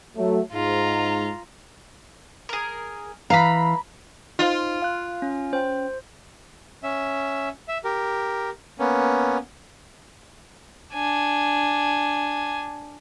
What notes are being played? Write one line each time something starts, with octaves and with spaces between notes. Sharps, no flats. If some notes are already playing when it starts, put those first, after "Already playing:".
F#3 A3
G#2 F4 A#5
G#4 A#4
E3 F5 A#5 B5
D#4 F4 C5
F5 F#6
C#4
C#4 C5 G5
C#4 E5
E5
G4 A#4
A#3 B3 C#4
D4 G#5